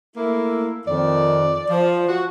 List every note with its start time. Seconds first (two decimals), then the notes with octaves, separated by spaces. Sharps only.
0.16 A3 A#3 E4
0.87 F2 D#3 D5
1.70 F3
2.09 F#4